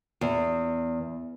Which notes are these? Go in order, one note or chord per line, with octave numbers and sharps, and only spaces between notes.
E2